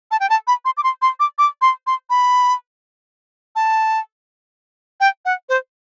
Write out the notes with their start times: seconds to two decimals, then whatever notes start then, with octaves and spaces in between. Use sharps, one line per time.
0.11 A5
0.20 G5
0.30 A5
0.47 B5
0.65 C6
0.77 D6
0.84 C6
1.02 C6
1.20 D6
1.38 D6
1.61 C6
1.87 C6
2.10 B5
3.56 A5
5.00 G5
5.25 F#5
5.49 C5